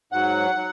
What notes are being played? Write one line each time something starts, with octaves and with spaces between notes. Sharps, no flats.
G#2 F#3 F#5
F#3